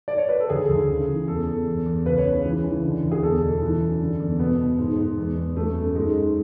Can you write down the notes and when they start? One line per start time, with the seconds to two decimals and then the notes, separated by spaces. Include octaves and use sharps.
0.08 D5
0.18 C#5
0.29 B4
0.40 A4
0.49 D2 G#4
0.69 D2
0.88 C#3
1.08 E3
1.28 E2 A4
1.47 E2
1.67 E2
1.86 E2
2.05 C#2 B4
2.18 C#5
2.25 C#3
2.45 E3
2.64 E3
2.84 D3
3.03 D2
3.11 G#4
3.22 E2 A4
3.42 B2
3.62 E3
3.81 F#2
4.00 D3
4.20 E2
4.39 B2 B3
4.58 B2
4.78 G#2
4.98 G#2
5.17 E2
5.37 E2
5.56 F#2 A3
5.75 F#2
5.95 G#2 G#3
6.15 G#2